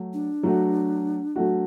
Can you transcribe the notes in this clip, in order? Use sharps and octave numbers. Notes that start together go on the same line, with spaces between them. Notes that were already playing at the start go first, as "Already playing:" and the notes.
Already playing: F#3 A3
D4
F#3 A3 F#4
F#3 A3 F#4